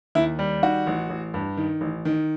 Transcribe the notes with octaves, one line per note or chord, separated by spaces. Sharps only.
D#2 E4
G3
D#3 F#4
A1
A1
G2
D#3
A1
D#3